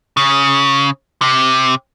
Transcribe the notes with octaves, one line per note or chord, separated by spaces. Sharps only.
C#3
C3